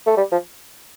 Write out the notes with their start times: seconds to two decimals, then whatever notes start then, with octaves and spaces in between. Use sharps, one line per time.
0.07 A3
0.17 G3
0.32 F3